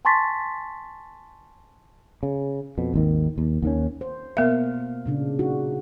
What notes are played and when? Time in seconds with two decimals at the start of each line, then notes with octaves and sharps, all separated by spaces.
0.05 G#5 A5 C6 C#6 A6 B6
2.23 C#3
2.78 F2 B2
2.94 G#1 D#2 D#3
3.38 D#2
3.62 D#2 D#3 C#4
4.01 C5
4.37 B2 A#3 B3 A#4 E5 F5
5.06 A#2 C#3 D4
5.39 D4 D#4 F#4